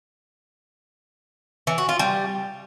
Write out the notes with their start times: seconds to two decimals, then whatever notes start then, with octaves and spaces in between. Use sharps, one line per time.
1.67 E3
1.78 F#4
1.89 F4
1.99 G3